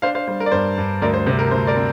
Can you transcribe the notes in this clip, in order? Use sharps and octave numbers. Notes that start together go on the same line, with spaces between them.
D4 C5 F5
C5 F5
G3 C5
A#4
D5
G2 C5
G2
D2 A#4 D5
C5
C3 C5
A#4
D2 C5
A#4 D5
C4